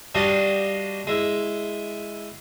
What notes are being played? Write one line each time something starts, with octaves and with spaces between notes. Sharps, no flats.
G3 D4 F#4 D#5 F5
G#3 E4